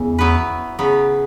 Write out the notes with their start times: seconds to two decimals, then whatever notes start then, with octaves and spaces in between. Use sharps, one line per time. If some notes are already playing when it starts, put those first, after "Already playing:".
Already playing: E2 C#3 E3
0.19 F#3 B3 E4 B4
0.79 C#3 F#3 B3